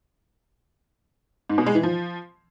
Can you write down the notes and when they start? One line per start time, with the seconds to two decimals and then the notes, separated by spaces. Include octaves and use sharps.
1.50 G#2
1.58 B2
1.66 G#3
1.75 E3
1.83 F3